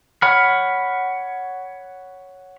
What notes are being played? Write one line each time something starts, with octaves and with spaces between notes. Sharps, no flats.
C#5 F#5 B5 F6